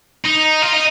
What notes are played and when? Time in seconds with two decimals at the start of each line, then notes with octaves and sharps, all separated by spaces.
0.25 D#4
0.62 F4
0.73 D#4